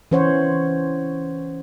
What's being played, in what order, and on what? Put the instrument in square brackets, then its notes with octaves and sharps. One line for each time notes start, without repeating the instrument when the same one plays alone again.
[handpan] E3 C#4 C5 C#5 F#5